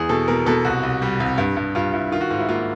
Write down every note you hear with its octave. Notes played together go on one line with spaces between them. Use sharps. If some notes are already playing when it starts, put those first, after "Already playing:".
Already playing: E2 G#4
B2 A4
B2 A#4
B2 A4
C2 F#4
C2
G3
C2
G2
G2
G2 F4
G2 E4
D#3 F4
F#4
G#2 F4
E4
A#3 F4